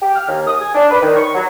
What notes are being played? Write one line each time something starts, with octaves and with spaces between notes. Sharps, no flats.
G4
F6
D#2
D#6
G#5
D4
B4
D#3
C#6
F#3